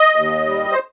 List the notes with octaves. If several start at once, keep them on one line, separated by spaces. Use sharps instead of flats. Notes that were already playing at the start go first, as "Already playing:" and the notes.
Already playing: D#5
D#2
G3
C5